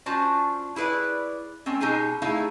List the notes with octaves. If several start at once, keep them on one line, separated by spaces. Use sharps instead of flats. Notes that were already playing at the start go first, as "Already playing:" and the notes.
C#4 D4 F4 F#4 C5 A5
E4 G#4 B4 C#5 D5
A3 C4 C#4
B2 D#4 G4 G#4 G#5
G3 A3 D#4 E4 G#4 F5